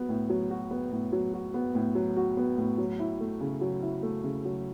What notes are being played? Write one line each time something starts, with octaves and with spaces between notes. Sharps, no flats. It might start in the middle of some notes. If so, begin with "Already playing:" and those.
Already playing: F#3 B3
A2
F#3
F#4
B3
A2
F#3
F#4
B3
A2
F#3
F#4
B3
A2
F#3
E4
A3
C#3
F#3
E4
A3
C#3
F#3